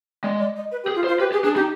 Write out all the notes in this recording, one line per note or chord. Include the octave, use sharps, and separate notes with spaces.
G#3 D5
D5
D#5
B4
G4
G#4
F4
C5
F4
G4 B4
G4 G#4
D4 G#4
D#4 G4